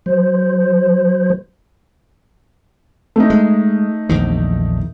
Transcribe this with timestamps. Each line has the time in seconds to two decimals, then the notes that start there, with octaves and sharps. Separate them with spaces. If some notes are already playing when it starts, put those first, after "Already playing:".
0.06 F#3 C5
3.16 A3 D#4
3.30 G#3
4.09 A#1 E2 D#3